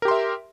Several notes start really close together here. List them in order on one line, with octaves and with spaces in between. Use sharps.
A#4 G4 C6 E5